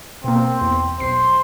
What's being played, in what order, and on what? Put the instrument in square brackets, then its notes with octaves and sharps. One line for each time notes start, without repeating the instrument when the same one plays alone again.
[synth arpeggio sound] B2 A#3 [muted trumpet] C4
[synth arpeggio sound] E2
[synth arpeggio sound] B1 C7 [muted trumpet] C5